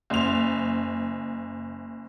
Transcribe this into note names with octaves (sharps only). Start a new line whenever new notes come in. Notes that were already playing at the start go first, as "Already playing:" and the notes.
F#1 F7